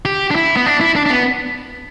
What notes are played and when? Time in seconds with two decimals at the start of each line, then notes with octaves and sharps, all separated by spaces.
0.05 G4
0.31 D4
0.35 E4
0.57 B3
0.66 D4
0.81 E4
0.96 D4
1.06 D4
1.10 B3